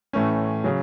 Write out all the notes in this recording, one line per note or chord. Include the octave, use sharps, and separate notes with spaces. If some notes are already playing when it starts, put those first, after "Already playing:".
A2 E3 A3 C#4
C#3 F#3